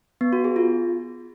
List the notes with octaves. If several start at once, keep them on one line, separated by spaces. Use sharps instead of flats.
B3
F#4
G#4
F4